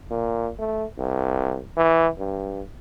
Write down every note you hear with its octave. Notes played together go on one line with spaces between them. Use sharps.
A#2
A3
C2
E3
G2